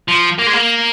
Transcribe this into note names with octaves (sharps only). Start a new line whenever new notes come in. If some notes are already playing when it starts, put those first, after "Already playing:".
F3
A#3
G#3
A#3